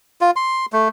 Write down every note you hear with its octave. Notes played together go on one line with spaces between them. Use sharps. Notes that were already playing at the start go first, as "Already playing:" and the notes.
F4
C6
A3